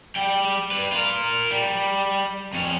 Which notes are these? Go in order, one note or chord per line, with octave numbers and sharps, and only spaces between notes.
G3 G5
G3 B4
F4 A#4
G3
F2 C#4